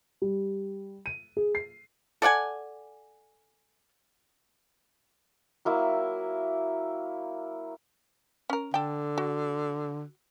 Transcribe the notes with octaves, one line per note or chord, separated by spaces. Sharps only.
G3
D#7
G#4
C7
A4 D5 F#5 G#5
F#3 A#3 E4
C#4 A#4
D3 A4 G5
F#4